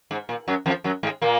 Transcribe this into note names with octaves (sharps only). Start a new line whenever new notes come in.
G#2
A#2
F#2 F#3
F2 F3
F#2 F#3
G#2 G#3
A#2 A#3